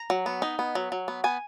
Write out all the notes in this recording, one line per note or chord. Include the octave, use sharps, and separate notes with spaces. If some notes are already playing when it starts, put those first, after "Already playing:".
Already playing: A#5
F#3
B3
D#4
B3
F#3
F#3
B3
B3 G#5